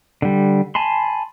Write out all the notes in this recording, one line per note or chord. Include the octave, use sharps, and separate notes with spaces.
D3 G3
G#5 A5 B5 C6